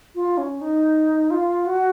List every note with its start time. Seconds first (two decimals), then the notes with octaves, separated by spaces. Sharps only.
0.15 F4
0.38 C#4
0.61 D#4
1.31 F4
1.66 F#4